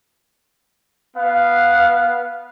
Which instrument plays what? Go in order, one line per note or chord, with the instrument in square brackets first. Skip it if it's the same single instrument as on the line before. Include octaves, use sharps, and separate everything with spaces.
[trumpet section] B3 F5